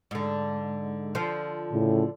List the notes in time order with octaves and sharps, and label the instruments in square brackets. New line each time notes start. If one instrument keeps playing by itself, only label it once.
[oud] G#2 D3
D3 F3
[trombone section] A2 C#3